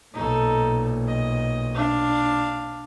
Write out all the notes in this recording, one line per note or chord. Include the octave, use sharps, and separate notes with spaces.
B1 A#2 D#4 A4
D#5
D4 F5